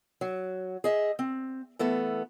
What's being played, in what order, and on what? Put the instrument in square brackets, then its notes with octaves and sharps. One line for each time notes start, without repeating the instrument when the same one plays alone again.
[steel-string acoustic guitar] F#3
G#4 D#5 E5
C4
E3 A3 B3 A4